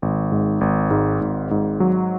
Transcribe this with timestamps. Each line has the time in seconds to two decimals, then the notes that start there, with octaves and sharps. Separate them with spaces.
0.02 G#1
0.32 G#2
0.61 G#1
0.91 G#2
1.21 G#1
1.51 G#2
1.80 F#3